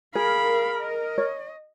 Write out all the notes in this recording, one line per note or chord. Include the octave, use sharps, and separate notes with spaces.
G#4 A#4 F5 B5
D#5
C#5